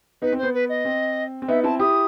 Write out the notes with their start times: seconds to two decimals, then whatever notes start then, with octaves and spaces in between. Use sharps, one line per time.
0.22 B3 D#4 B4
0.32 C4
0.38 C5
0.43 B3
0.53 B4
0.69 D#5
0.85 C4
1.42 C4
1.48 B3 D#4 E5
1.64 C4 E4 A5
1.79 E4 G4 D#6